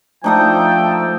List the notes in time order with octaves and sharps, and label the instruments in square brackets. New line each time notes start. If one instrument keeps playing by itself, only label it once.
[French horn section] F3 [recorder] A3 [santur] D4 D#4 D#6 [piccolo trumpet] G5